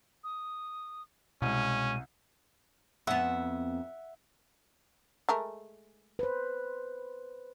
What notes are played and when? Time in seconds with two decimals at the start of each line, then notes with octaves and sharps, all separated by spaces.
0.24 D#6
1.42 C2 B2 G#3 C#4 D#7
3.07 F2 B3 E5 F#5
5.29 G#3 A3 A#4
6.19 B4 C5